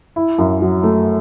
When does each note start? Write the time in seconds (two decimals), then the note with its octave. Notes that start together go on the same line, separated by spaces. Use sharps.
0.16 E4
0.38 F#2
0.61 F#3
0.84 A3